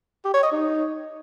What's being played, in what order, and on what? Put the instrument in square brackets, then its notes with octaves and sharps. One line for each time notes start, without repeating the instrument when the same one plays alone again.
[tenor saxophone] G4
C#5
D#5
D#4